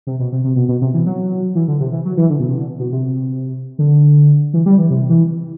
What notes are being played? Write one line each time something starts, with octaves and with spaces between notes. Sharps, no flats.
C3
B2
C3
C3
B2
B2
C3
E3
F#3
E3
D3
C3
E3
F#3
E3
D3
B2
C3
D3
B2
C3
D3
E3
G3
E3
C3
E3